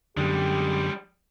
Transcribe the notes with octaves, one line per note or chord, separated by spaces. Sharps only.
F#2 D3 G3 G#3 G4